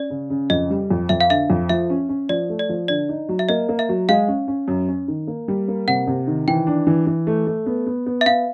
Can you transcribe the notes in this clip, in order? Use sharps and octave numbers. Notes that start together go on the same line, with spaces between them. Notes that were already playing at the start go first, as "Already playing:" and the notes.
Already playing: C#4 D5
C#3
C#3
F2 D#5
G3
F2
F2 E5
F5
D3 E5
F2
F3 E5
C#4
C#4
F3 D5
A3
D5
F3
D3 D5
D#4
F#3
E5
A#3 D#5
A#3
E5
F#3
G#3 F5
C#4
C#4
F#2
C#4
D#3
A#3
G3
A#3
C3 F#5
C3
D#3
E3 G5
D4
E3
E3
A3
A3
B3
B3
B3
E5
B3 F5